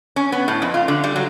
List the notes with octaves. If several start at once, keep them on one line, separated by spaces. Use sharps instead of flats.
C#4
B3
A2
F2
F4
D3
G3
F#3